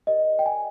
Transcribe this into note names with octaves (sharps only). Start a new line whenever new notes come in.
G4 A#4 D5 D#5
G5
G#5